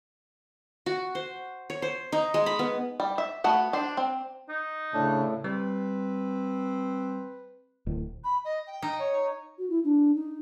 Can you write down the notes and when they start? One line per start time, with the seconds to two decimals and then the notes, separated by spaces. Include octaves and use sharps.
0.86 F#4
1.15 C5
1.70 C#5
1.82 C5
2.12 D#4
2.34 G#3
2.46 B5
2.59 B3
3.00 G3
3.18 E5
3.44 A3 B3 F#4 F#5
3.73 D4 C5
3.97 C4
4.49 D#4
4.94 A2 C#3 D4
5.44 G3 C4 B4
7.86 D1
8.24 B5
8.44 D#5
8.66 G5
8.82 D#4
8.98 C#5
9.58 F#4
9.70 E4
9.84 D4
10.15 D#4